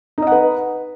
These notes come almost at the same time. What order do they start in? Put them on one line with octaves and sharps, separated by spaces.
D#4 D#5 F#5 B4